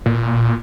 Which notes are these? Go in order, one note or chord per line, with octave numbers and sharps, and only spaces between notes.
A#2